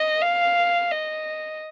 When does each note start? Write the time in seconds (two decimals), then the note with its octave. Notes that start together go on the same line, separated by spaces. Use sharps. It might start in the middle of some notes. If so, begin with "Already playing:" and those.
Already playing: D#5
0.22 F5
0.92 D#5